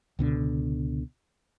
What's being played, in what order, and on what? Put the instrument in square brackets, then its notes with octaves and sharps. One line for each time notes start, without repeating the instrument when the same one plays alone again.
[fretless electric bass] C#2 B2 D3